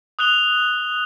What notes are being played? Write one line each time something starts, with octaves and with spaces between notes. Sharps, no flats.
D#6 F#6 F7 G7